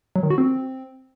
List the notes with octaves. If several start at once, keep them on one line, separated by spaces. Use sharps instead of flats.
F#3
D#3
F#4
C4